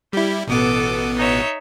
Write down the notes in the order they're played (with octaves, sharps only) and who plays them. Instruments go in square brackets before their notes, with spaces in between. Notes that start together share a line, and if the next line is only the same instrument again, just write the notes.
[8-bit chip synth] G3 E4 [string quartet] G4
[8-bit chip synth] A1 B2 B3 [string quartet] A4 D6 D#6
[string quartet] D#4 C#5 E5